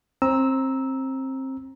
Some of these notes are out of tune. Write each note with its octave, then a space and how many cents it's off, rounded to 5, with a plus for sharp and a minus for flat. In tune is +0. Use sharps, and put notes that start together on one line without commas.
C4 +25 A#5 +5 E6 -15